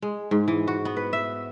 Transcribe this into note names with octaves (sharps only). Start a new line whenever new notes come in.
G#3
G#2
E3
F#4
B3
B4
E5